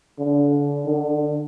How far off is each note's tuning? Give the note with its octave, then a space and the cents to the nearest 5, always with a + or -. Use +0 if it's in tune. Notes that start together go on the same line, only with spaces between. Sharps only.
D3 -35
D3 +25